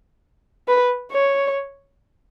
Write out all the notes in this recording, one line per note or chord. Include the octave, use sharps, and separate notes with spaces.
B4
C#5